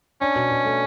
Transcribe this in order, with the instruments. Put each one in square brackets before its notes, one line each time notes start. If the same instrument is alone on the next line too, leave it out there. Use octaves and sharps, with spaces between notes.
[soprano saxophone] C#4 [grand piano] D4
[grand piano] B2
B2
A3